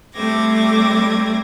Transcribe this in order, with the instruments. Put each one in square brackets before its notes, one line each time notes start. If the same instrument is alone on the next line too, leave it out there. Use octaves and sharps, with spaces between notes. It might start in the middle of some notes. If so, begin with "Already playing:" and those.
[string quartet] G3 A3 C4 D6 G#6 A#6